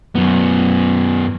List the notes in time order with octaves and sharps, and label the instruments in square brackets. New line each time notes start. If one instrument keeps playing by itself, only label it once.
[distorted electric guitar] F#2 B3